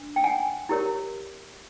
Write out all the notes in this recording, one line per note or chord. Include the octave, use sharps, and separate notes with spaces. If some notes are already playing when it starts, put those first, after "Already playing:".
Already playing: D4
G5
F#5 G#5
E4 G4 A#4 C#5